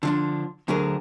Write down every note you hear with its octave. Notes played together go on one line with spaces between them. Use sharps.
D3 F3 D4
D2 D3 F#3 G#4 A#4